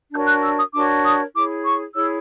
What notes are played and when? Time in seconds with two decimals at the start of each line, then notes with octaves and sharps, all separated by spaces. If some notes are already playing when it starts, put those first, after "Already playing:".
0.12 D4 F#4 A#4 C#5 G6
0.27 F#6
0.42 E6
0.57 D#6
0.73 D4 F#4 A#4 C#5 D6
1.04 D#6
1.34 E4 G#4 C#5 D6
1.65 C#6
1.95 E4 G#4 C#5 E6